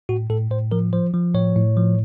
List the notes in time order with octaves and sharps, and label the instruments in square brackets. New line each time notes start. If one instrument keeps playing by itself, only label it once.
[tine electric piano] A2 F#4
A2 A4
A2 C5
F3 A#4
F3 C5
F3
A2 C#5
A2
F3